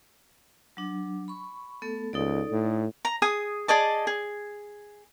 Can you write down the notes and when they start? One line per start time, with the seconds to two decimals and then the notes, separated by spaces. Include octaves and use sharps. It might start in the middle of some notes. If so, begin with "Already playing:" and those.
0.77 F#3 D4
1.28 B5 C#6
1.82 A3 B3 A4
2.13 C#2 D#4 A4 D5
2.51 A2
3.05 A#5
3.22 G#4 G#5 D#6
3.68 G#4 D5 D#5 A5
4.07 G#4